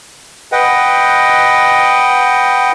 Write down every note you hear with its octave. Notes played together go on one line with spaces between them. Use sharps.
B4 D#5 F#5 G5